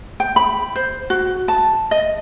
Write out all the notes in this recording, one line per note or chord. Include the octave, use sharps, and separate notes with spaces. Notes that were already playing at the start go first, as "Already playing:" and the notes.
G5
B5
C5
F#4
A5
D#5